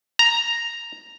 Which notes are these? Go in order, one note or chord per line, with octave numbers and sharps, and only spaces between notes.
A#5